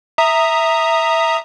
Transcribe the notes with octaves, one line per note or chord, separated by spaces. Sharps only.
E5 A#5 D#6